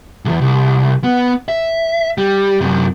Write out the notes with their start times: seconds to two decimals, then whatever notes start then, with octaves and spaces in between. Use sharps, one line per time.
0.25 B1 E2
0.41 C2
1.04 B3
1.48 E5
2.18 G3
2.60 F#2 C3